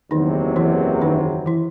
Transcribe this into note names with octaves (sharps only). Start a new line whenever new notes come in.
F#1 E2 C3 D#3 F#3 D#4
E3 E4
D#3 D#4
E3 E4